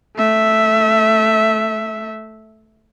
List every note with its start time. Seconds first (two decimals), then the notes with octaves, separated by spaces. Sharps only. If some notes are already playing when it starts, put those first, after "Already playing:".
0.16 A3 E5